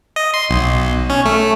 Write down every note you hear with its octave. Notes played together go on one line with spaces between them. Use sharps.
D#5
C6
B1
C#4
A3